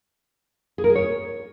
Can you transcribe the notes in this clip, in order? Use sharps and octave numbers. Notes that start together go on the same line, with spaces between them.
G#4
A#4
G#4
C#5